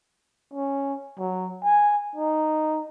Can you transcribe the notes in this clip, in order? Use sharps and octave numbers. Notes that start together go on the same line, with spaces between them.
C#4
F#3
G#5
D#4